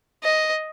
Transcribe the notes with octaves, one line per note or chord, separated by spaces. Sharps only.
D#5